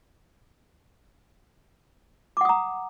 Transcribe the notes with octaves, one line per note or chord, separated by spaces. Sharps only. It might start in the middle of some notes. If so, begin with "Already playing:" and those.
F#5 A#5 D6 D#6